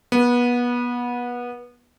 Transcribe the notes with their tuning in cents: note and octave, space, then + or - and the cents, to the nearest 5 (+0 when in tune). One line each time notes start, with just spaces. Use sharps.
B3 -25